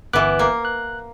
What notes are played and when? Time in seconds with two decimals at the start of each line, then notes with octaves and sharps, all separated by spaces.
0.13 G1 E3 B3 D6 F#6
0.39 A#3
0.65 F#6